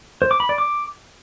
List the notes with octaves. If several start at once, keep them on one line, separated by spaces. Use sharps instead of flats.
C5
D6
B5
D5
D6